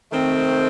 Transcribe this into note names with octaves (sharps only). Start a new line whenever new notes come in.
D#3 A3 C4